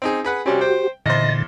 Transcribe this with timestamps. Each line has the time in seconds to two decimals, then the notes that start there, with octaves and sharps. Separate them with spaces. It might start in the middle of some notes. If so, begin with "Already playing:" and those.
0.02 C4 D#4 G#4
0.24 G#4 B4 F#5
0.46 C3 G3 C4 C#4 F#4 G4
0.61 C5 G5
1.06 E2 A#2 D3 C5 D#5 A6